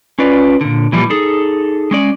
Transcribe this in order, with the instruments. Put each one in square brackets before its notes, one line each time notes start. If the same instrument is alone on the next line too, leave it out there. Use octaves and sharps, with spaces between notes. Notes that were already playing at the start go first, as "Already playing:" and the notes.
[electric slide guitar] C#4 F4 B4 D5
A#2 D3
A#2 E3 F3 G3
D#4 G#4 A4
G#3 C#4 D5